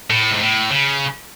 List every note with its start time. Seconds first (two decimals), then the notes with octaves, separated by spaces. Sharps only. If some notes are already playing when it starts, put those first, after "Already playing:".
0.10 A2
0.31 G#2
0.41 A2
0.71 C#3